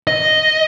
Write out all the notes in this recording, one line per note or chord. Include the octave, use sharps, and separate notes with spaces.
D#5